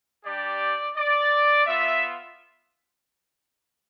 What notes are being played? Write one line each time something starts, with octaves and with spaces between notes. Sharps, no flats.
G3 D4 G4 D5
D5
B3 F4 E5